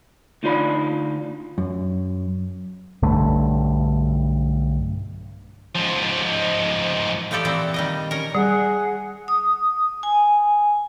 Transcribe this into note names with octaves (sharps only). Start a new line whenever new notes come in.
D2 D#4 F4 D5 B5
F#2
B1 G2 D3 A3
G#2 F3
E3 F3 G4 A4 D5
A#2 E3 C4
D#3 G3 D#5
C#4 A#4
G3 G#4 F#5
D#6
G#5